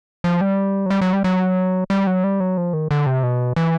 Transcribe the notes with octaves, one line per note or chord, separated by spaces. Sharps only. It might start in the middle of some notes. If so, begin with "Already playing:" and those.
F3
G3
F#3
G3
F#3
G3
F#3
G3
F#3
G3
F#3
F3
D#3
D3
C3
B2
E3